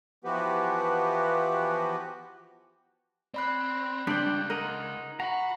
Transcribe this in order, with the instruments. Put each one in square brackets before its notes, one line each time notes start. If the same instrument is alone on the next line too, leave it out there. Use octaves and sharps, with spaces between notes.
[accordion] E3 F3 B3 F#4 G4 B4
[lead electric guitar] C4 [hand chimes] D5 B5 F#6
[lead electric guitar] C#2 [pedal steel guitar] G3 D5 G5 [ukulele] D4 C5 [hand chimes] F#6
[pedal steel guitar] D#4 D#5 F#5 [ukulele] A#4
[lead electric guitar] F#4 [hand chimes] F#5 [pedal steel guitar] A#5 B5